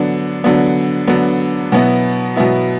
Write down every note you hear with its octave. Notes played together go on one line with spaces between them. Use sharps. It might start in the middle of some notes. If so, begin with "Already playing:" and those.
Already playing: D3 F#3 B3 D4
D3 F#3 B3 D4
D3 F#3 B3 D4
B2 F#3 B3 E4
B2 F#3 B3 E4